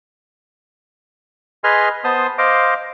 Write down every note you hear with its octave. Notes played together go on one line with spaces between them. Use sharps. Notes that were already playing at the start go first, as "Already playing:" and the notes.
G#4 B4 D#5 G#5 C6 F6
B3 C5 A5 C6 D#6
C5 D#5 F5 D6